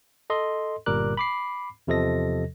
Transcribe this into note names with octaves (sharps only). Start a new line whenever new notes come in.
A4 D#5 C6
G1 A#2 G3 A#4 D6 F#6
B5 D6 C7
E2 C3 F3 A4 D#5 A#6